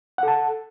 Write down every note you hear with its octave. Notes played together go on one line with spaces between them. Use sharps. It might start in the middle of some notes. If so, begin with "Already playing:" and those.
A4 F#5 A5